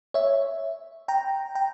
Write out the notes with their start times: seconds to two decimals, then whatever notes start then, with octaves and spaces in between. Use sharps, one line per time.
0.14 C#5 E5
1.08 G5 A#5
1.55 G5 A#5